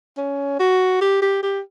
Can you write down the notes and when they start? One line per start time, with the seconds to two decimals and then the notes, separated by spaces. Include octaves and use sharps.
0.18 C#4
0.59 F#4
1.01 G4
1.22 G4
1.43 G4